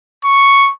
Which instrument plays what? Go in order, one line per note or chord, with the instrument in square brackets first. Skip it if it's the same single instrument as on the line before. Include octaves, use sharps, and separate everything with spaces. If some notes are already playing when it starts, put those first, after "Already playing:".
[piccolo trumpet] C#6